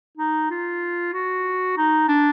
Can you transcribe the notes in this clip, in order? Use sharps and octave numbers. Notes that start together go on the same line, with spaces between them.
D#4
F4
F#4
D#4
D4